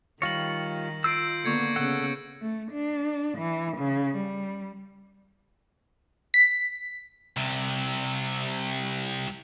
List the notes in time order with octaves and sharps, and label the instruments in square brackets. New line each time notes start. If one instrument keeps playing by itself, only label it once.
[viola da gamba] D#3 [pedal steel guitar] G3 F4 C#5 [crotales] A#6 F#7
[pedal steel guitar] F4 E6 [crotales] G6 C7 D7
[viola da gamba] D3 A#3 B3 [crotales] C#6 G#6 C#7
[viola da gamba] C#3 B3 [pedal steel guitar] A4 F#5
[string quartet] A3
D4
E3
C#3
G3
[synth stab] B6
[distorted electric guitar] C2 C3